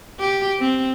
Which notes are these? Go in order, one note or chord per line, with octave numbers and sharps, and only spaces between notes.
G4
C4